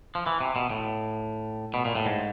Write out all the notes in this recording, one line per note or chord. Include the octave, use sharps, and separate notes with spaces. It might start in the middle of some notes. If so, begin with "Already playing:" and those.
F3
E3
C3
B2
A2
B2
A#2
A2
G#2